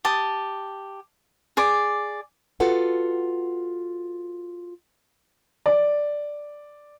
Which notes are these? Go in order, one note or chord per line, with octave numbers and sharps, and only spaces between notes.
G4 A5 D#6
G#4 D5 D6
F4 F#4 A4 B4 F#5
D5